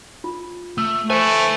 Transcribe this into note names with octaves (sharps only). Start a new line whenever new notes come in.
F4
A3 E6
A3 C5 E5 G#5